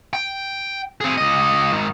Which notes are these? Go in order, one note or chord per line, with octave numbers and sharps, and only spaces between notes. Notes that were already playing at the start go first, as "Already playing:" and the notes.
G5
C4 G#4
C#2 D#5
G#2 D#3